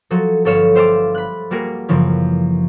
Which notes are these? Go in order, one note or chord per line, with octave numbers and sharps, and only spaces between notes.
F3 F#3 F#4 A4
G1 A4 C#5 F5 E7
G4 C5 E5 F5 A5 D6
B5 F#6
G3 A#3 F#4 G#4 A#4
F#2 C#3 E3 F3 C#4